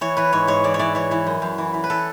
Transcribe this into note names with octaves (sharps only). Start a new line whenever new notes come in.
E3 C#5
E3 B4
G#2 C#5
G#2 C#5
E3 D5
C#5
E3 D5
E3 C#5
E3
F#2
F#2
E3
E3
B4
E3 A4